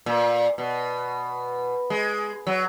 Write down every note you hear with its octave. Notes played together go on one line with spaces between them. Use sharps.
A#2
B2
G#3
F#3